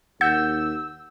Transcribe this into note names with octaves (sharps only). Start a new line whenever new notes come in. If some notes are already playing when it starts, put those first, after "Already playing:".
D#2 F#5 E6 G6